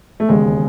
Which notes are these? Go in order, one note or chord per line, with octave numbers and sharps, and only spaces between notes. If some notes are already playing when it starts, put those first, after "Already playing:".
A3
E1 D#2 C#3 G#3